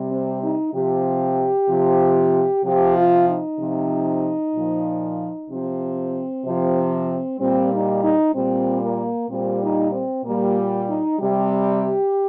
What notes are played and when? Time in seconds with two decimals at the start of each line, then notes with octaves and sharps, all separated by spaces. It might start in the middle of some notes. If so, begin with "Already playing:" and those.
Already playing: C3 G3
0.11 C4
0.43 D#4
0.74 C3 F3 G4
1.69 C3 F3
2.64 C3 F3 G4
2.96 F4
3.27 D#4
3.59 C3 F3
4.55 A#2 F3
5.49 C3 F3 C4
6.44 C3 F3
7.40 A#2 G3 C4
7.71 D#4
8.03 D#4
8.34 A#2 G3 C4
8.82 A#3
9.29 A#2 G3 C4
9.61 D#4
9.92 C4
10.24 A#2 G3 A#3
10.88 D#4
11.19 C3 G3 G4